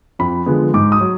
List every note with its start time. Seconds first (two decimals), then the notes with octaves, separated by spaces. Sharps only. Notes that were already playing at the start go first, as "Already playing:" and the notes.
0.19 F2 B5
0.46 D3 F3 G#3 B3
0.74 G#2 D6
0.92 D#6
1.01 F#3